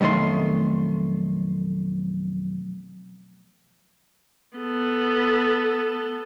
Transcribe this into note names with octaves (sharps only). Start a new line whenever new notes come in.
B1 F2 D#3 A3 C6
B3 A4